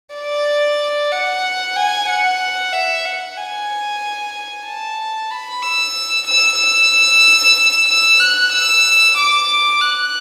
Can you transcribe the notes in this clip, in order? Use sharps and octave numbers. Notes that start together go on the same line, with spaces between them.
D5
F#5
G#5
F#5
E5
F#5
G#5
A5
B5
E6
E6
E6
E6
F#6
E6
D6
F#6